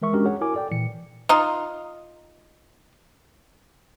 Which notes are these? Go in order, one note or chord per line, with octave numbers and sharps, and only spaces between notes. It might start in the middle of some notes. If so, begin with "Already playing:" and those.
E3 G#3 A#4 E5 C#6
G#3 C#4 D4 F#4 G4 A#4
G#4 C#5 F#5
E4 F#4 A#4 G#5 D6
A4 D5 G5
A#2 E3 C#7
D#4 F4